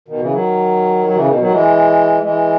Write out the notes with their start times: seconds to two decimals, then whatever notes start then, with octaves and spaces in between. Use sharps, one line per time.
0.08 B2 D#3
0.20 C#3 E3
0.32 D#3 F#3
1.06 F#3
1.15 C#3 E3
1.27 B2 D#3
1.39 D#3 F#3
1.50 E3 G#3
2.22 E3 G#3